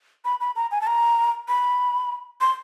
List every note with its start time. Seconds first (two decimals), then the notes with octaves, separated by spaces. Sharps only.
0.25 B5
0.41 B5
0.56 A#5
0.71 G#5
0.81 A5
0.87 A#5
1.48 B5
2.41 C6